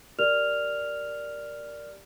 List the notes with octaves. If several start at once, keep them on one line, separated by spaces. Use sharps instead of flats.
G4 A#4 D5 F6 F7